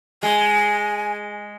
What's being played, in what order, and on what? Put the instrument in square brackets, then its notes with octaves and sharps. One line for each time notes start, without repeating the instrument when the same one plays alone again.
[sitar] G#3 [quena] G#5